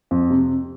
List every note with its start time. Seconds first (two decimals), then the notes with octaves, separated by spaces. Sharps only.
0.11 F2
0.30 C3